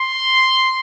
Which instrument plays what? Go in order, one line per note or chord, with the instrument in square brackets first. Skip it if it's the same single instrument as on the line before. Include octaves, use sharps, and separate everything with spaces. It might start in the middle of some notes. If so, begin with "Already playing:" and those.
Already playing: [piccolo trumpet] C6